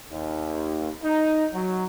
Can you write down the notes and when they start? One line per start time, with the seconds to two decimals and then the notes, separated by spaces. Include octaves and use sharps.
0.11 D#2
1.04 D#4
1.54 F#3